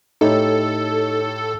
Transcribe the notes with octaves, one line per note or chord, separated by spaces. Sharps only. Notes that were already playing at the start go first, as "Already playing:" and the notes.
A2 D#4 G4 A4 C#5